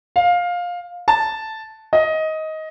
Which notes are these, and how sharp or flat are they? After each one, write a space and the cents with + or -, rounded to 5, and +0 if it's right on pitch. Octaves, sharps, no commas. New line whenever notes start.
F5 +15
A5 -5
D#5 +15